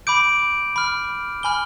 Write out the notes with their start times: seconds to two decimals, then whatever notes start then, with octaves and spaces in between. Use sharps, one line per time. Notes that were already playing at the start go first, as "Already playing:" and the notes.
0.07 B5 D6 G6 D7
0.76 B5 F6
1.43 G#5 B5 F6 G7